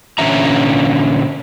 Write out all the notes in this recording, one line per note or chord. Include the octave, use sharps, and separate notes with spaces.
A#2 D3 E3 C#4 E5 A#5